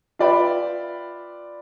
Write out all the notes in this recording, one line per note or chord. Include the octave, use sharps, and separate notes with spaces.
F4 B4 D5 E5 G5 B5